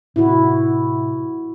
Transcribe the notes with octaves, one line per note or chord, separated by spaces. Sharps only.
A2 C3 E4 F#4